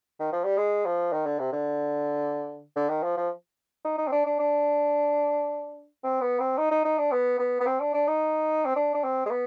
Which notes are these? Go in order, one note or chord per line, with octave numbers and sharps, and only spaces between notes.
D#3
F3
G3
G#3
F3
D#3
D3
C3
D3
D3
D#3
F3
F3
D#4
D#4
C4
D4
D4
D4
C4
B3
C4
D#4
D#4
D#4
D4
B3
B3
B3
C4
D4
D4
D#4
C4
D4
D4
C4
G#3
B3